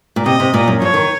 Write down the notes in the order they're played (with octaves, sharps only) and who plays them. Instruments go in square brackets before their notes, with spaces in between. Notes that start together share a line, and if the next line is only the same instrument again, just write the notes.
[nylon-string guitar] A#2
[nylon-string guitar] C3 [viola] D#5
[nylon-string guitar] C3
A#2
F#2
[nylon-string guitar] F3 [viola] C#5
[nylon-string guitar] D#3